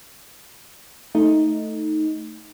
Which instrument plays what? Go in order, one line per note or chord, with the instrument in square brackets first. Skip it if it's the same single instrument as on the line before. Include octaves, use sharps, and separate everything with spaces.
[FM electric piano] A3 D#4